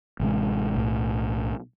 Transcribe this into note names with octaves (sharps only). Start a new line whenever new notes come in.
A1 C3 G#3
B1 A2